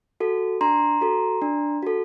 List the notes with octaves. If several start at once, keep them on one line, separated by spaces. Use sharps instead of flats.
F#4 A4
D4 A#5 C6
F#4 A4
D4
F#4 A4